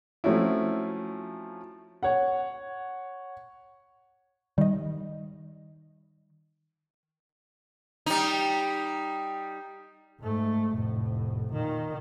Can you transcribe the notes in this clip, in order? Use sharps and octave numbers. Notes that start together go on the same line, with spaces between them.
F3 F#3 A3 C4 C#4 E4
C#5 F#5
D#3 G3 D#5
G3 D#4
G#2 A3
F1 A2
A#2 D#3